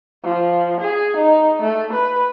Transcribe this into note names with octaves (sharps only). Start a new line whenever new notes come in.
F3
G#4
D#4
A3
B4